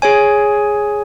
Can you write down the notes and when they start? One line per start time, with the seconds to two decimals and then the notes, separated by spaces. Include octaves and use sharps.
0.02 G#4 C#5 G#5